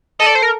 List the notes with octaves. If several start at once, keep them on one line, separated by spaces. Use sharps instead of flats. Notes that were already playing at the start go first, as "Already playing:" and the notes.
A4 D#5
D5
C5
A#4